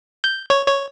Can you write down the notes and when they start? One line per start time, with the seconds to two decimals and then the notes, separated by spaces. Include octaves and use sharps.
0.24 G6
0.50 C#5
0.68 C#5